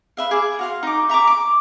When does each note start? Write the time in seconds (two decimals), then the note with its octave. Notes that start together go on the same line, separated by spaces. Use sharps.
0.17 B4 E5 F5
0.31 G#4 D6
0.59 F#4 F5 C6
0.83 D#4 D6
1.09 E5 A#5 C#6 D6
1.27 D6